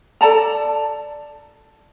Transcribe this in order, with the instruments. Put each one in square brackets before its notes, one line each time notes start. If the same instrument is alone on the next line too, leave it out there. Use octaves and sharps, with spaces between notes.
[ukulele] A4 D5 A5 A#5